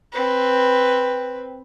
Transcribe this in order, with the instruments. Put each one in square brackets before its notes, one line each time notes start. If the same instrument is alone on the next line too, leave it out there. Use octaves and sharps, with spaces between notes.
[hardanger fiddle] C4 B4